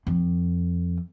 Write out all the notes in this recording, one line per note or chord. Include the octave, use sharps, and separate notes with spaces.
F2